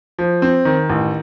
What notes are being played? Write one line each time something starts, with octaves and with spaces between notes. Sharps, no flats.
F3
C4
D#3
A1